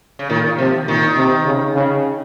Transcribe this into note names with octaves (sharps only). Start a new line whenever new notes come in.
C#3
A#2 D#3
C3 F3
A#2 D#3
C3
C#3
C#3